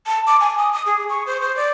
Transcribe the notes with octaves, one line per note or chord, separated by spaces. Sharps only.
A5
D6
G#5
D#6
D#6
G#4
C#6
C5
C5
D5